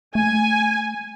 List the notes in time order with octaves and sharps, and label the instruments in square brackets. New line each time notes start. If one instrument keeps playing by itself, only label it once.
[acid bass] A3 [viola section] G#5